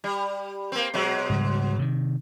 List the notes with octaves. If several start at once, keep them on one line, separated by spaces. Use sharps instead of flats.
G3
A#3 C4
B2 F#3 G#3
G#2 C#3 G3
C3 D#3